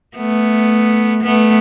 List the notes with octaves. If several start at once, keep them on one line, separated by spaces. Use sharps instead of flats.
A3 B3
A3 B3